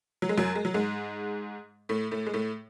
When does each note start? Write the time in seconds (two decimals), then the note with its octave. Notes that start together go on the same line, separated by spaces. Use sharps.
0.22 F#3
0.29 G#3
0.38 F#2 F#3
0.55 G#3
0.65 F#3
0.74 G#2 G#3
1.89 A2 A3
2.11 A2 A3
2.27 G#3
2.34 A2 A3